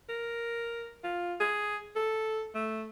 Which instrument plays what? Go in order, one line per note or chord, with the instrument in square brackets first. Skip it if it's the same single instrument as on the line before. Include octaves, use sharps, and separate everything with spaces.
[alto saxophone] A#4
F4
G#4
A4
A3